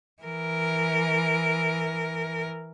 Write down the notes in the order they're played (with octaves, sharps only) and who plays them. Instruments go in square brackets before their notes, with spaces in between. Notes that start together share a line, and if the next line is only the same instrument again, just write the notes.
[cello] E3 A#4